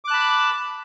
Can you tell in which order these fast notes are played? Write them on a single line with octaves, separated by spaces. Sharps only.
D6 F#6 A5 B5